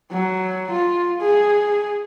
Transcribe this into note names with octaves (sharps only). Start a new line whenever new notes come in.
F#3
F4
G#4